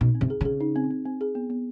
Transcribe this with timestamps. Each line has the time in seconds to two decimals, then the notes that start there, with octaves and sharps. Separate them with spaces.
0.01 B2 D#4
0.15 C4
0.21 C3
0.30 G#4
0.41 C#3 G#4
0.60 D#4
0.76 C4
0.91 C4
1.05 C4
1.21 G#4
1.35 B3
1.50 B3